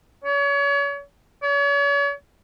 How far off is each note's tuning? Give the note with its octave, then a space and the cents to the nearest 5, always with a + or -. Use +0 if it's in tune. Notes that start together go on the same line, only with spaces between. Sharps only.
C#5 +35
C#5 +40